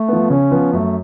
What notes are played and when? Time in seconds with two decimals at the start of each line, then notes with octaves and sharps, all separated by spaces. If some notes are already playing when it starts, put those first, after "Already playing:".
Already playing: A3
0.08 F3 B3
0.30 C#3 C#4
0.51 F3 B3
0.73 F#2 A3